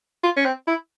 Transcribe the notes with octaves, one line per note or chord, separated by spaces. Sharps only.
F4
C#4
C4
E4